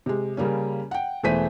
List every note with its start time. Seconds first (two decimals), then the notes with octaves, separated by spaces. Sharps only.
0.06 C3 G#3
0.37 C#3 G3 A#3 C#4
0.91 F#5 G5
1.23 E1 E3 A3 C5 B6 D#7